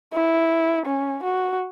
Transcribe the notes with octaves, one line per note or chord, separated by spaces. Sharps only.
E4
C#4
F#4